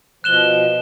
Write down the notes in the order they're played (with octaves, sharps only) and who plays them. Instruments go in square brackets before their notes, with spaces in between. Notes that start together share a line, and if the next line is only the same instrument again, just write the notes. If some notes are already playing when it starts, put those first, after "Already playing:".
[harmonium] B2 F3 [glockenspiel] F#6 E7 G7